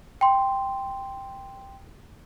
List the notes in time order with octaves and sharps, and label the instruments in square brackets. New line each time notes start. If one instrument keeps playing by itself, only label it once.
[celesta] G5 C6